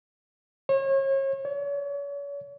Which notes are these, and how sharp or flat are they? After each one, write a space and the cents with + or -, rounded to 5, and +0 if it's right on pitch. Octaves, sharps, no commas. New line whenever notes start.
C#5 -35
C#5 +40